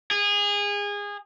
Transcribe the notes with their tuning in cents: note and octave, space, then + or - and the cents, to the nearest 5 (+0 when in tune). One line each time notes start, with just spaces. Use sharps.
G#4 -25